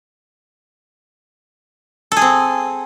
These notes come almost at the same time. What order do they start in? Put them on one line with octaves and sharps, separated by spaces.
A4 G#4 C4